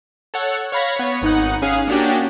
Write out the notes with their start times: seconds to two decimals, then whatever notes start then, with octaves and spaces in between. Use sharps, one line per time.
0.34 A4 C#5 F#5
0.72 C#5 F5 B5 G#6 A#6
0.96 B3 C#5
1.22 G#1 D#4 F#5
1.62 C#4 G#4 F5
1.88 A#3 C#4 D4 F#4 G4